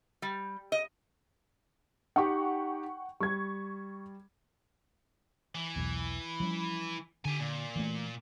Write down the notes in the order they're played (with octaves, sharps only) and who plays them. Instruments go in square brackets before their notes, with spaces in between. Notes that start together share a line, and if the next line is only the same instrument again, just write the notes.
[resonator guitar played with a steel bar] G3
D#5
[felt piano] D#4 G4 [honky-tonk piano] F#5 G5 C#6
[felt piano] G3 [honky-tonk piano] C#6 G#6
[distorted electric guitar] E3
[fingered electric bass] B1 E2
F3 G3 C#4
[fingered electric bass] D3 [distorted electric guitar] G4 G#5
[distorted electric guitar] A#2
[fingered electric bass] E3 A3